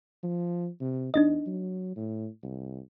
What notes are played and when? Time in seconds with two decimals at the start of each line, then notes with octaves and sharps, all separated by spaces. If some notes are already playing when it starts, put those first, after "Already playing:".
0.23 F3
0.80 C3
1.14 E2 D4 D#4 D#5
1.47 F#3
1.96 A2
2.43 C2